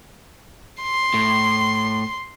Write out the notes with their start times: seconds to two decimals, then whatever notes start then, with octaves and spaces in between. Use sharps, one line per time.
0.82 C6
1.14 A2